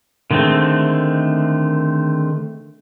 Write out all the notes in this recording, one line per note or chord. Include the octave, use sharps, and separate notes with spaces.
D3 D#3 G#3 A3 C4